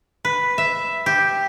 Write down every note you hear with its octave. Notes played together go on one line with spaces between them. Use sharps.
B4
E5
G4